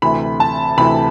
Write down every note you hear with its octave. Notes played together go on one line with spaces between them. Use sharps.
D2 C3 E3 B5
A5
D2 C3 E3 B5